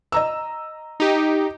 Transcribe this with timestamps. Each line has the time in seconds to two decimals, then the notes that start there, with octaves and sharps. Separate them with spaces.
0.12 D#5 A#5 E6
1.00 D#4 G4